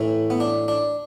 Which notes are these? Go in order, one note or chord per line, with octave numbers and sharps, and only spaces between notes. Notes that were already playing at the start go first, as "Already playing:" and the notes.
Already playing: A2 E3 A3
B3
D4
D4